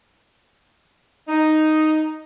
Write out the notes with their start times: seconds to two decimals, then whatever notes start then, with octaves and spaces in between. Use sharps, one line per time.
1.28 D#4